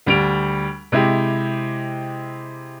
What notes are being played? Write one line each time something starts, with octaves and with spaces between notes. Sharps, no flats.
D2 G3 D7 F7
C3 G#3 E4 G4